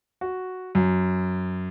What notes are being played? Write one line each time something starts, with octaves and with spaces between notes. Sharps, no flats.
F#4
F#2